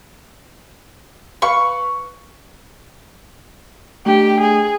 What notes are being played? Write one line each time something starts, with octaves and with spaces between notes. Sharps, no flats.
B4 F5 B5 C#6
A3 D4 G4 G5
G#4